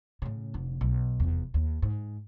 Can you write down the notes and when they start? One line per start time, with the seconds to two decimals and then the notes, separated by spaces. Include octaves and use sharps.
0.22 A2 C#3
0.54 F1 D3
0.81 B1
1.20 F1 E2
1.54 D#2
1.82 G#2